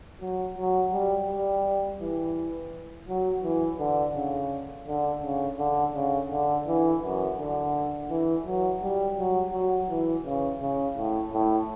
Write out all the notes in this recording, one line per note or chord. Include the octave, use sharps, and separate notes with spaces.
F#3
F#3
G3
G3
E3
F#3
E3
D3
C#3
D3
C#3
D3
C#3
D3
E3
F#2
D3
E3
F#3
G3
F#3
F#3
E3
C#3
C#3
A2
A2